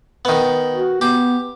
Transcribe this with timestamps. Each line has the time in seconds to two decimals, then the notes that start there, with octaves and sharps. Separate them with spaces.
0.25 D#3 B3
0.73 F#4
1.01 B3 G4